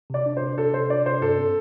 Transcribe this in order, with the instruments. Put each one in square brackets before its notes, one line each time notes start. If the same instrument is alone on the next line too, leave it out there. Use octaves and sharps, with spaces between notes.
[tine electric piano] C3 [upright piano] D5
[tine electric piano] D4
[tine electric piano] C3 [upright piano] C5
[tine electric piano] C3 [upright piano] A4
[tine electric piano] C3 [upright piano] C5
[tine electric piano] D4 [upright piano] D5
[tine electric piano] C3 [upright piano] C5
[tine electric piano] G2 [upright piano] A4
[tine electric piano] C4